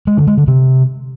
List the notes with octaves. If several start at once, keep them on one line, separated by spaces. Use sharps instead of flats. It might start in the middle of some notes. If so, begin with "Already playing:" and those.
G#3
D3
G#3
D3
C3